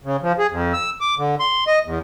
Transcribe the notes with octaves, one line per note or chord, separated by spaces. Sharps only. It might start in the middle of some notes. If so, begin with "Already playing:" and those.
C#3
F3
G#4
F2
E6
D6
D3
C6
D#5
E2